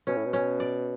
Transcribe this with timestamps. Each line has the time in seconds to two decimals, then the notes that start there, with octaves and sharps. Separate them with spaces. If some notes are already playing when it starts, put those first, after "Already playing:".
0.07 B2 C#4
0.16 A2
0.25 B2
0.33 C#4
0.60 D5